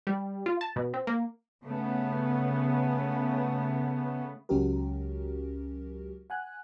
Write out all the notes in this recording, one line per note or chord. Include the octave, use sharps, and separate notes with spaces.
G3
F4
A5
B2
C4
A#3
C#3 A3 B3
C#2 F#3 C#4 F#4 G4 A#4
F#5 G#5 F#6